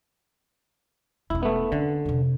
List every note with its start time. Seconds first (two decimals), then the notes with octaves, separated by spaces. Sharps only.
1.30 E1 C#4 E4
1.43 A3 B3
1.72 D3 C#4
2.06 F2 C3